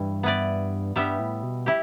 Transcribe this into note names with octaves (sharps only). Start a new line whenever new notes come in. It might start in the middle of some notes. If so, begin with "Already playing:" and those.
Already playing: G2 E3 G3 E4
B3 E4 B4 D5
G2 G3 B3 G4 E5
A2
B2
E4 G4